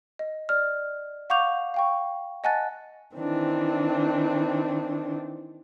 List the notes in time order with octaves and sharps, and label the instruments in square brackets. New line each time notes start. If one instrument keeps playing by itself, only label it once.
[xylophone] D#5
D5 F6
F5 F#5 C#6 D6 G6 F7
F5 G5 C#6
D#5 F#5 G#5 A5 F#6 A6
[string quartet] D#3 E3 C4 D4